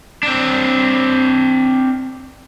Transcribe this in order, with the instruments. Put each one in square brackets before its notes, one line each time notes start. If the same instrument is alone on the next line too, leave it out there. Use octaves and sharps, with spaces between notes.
[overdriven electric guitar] C4 D4